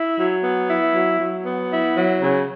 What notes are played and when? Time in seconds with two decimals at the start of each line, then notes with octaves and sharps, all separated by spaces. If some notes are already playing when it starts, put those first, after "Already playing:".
Already playing: E4
0.16 F#3
0.43 B3
0.68 E4
0.94 F#3
1.19 F#3
1.46 B3
1.71 E4
1.97 F#3
2.22 C#3